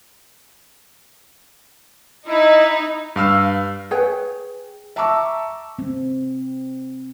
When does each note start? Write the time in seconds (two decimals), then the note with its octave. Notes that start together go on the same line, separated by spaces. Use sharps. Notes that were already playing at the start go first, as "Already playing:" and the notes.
2.28 D#4 E4
3.16 G2 F5 E6 F6
3.91 G#4 B4 C#5 G5
4.96 E5 A5 A#5 C#6 D6 E6
5.79 C4